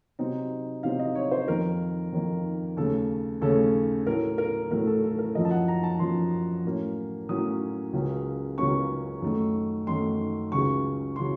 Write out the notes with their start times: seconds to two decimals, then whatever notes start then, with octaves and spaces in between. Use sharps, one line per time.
0.19 C3 F#3 C4 D#4
0.83 C3 F#3 C4 D#4 F5
0.99 D#5
1.15 C#5
1.31 C5
1.48 F2 D#3 A#3 A#4
2.12 F2 D#3 A#3
2.77 D#2 C#3 A3 C#4 A4
3.41 D#2 C#3 A3 C#4 A4
4.06 A2 F#3 A3 A#4
4.38 A#4
4.71 A2 F#3 A3 A#4
4.87 A4
5.04 A4
5.19 A#4
5.35 F#2 F3 A#3 D#5
5.45 A5
5.51 F#5
5.68 A#5
5.83 A5
5.99 F#2 F3 A#3 C6
6.65 A2 F#3 A#3 C#4
7.29 A2 F#3 A#3 C#4 D#6
7.93 C#2 C#3 F#3 A#3 C#4
8.58 C#2 C#3 F#3 A#3 C#4 C#6
9.22 F#2 D#3 A3
9.87 F#2 D#3 A3 C6
10.52 C#2 C#3 F#3 C#6
11.16 C#3 F#3 C6